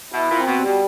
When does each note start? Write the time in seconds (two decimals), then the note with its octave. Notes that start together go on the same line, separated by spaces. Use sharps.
0.12 B2 E4
0.30 A#2
0.35 C4
0.46 B2
0.58 G3
0.64 B2